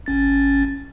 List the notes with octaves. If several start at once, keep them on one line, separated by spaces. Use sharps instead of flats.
G#1 C#4 A6